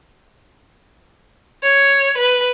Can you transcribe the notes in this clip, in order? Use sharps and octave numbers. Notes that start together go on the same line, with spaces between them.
C#5
B4